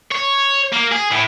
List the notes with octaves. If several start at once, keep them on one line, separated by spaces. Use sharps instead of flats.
C#5
A#3
G#4
A2